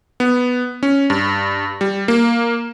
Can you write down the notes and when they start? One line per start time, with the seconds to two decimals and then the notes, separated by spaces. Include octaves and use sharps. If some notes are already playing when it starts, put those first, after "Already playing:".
0.20 B3
0.83 C#4
1.10 G2
1.81 G3
2.08 A#3